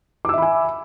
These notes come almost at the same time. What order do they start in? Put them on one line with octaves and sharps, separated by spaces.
D6 E6 E5 B5 G#5